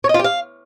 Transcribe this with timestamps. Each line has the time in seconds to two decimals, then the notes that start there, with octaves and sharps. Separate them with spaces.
0.04 C#5
0.09 D#5
0.14 F4
0.19 G4
0.24 F5